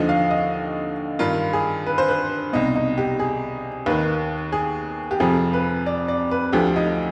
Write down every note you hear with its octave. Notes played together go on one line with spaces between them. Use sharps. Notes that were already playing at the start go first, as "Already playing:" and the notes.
Already playing: D#2 D3 F3 D#5
F5
D#5
G2 D#3 F4
G#4
B4
C5
B4
C2 B2 D#4
D#4
G4
G#4
D#2 D#3 B4
G#4
G4
F2 C3 F3 G#4
B4
D5
D5
B4
D2 D3 F3 G4
D#4